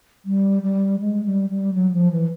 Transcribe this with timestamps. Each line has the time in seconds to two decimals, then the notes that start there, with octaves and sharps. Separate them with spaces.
0.25 G3
0.62 G3
1.00 G#3
1.25 G3
1.49 G3
1.74 F#3
1.93 F3
2.12 E3